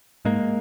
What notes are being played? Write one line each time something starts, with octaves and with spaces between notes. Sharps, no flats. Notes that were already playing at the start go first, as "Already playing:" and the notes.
G#2 G#3 A#3